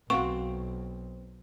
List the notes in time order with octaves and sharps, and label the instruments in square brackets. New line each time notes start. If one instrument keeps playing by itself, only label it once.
[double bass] B1 [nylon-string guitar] C4 [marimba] F#4 F5 F#5 [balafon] C#6